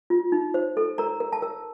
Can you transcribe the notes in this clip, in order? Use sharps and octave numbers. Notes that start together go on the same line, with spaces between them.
F4
D#4
C5
A4
A#4 A#5
A#4
A5
A#4